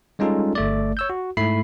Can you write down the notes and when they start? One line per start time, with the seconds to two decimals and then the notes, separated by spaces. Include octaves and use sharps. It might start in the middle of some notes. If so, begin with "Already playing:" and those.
0.19 G3 G#3 C#4 D#4 F4 A4
0.55 G1 A3 D5
0.97 C#5 E6 G6
1.10 F#4
1.37 G#2 A3 E4 B5 C7